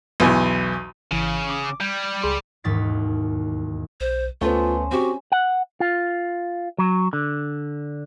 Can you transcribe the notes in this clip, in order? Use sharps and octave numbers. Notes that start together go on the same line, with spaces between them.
B1 E2 E3 G#5
G#1 C#3 E3
D6
G3 G6 G#6
C#2 G#4 C6
E1 D#2 G#2 A6 B6
B1 C5
D2 A3 B3 C#4 F4 C5
C4 F#4 G4 C#6
F#5
F4
F#3
D3